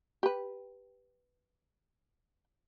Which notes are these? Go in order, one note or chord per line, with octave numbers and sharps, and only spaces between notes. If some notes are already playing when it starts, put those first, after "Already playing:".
G4 B4